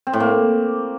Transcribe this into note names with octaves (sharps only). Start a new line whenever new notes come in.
C4
A2
A#3